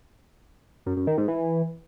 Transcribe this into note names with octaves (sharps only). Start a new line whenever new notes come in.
F#2
F#2
D#3
G#2
E3